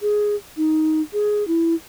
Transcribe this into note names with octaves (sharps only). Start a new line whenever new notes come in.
G#4
D#4
G#4
E4